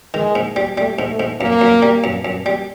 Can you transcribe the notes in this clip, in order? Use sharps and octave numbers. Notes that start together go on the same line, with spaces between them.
D#3 G#3
G#2
G3
G3 A3
G#2
A3
G#2
F#2 A#3
F#2
G3
F#2
F#2
G3